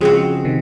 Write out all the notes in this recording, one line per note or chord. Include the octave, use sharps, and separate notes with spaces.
C#3 F3 G#3 C4 F#4
C3 D#3